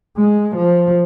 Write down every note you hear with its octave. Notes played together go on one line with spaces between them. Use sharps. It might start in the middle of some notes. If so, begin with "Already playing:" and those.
G#3
F3